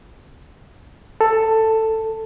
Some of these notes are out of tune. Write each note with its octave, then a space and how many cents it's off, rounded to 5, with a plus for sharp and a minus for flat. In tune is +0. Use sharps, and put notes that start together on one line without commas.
A4 +10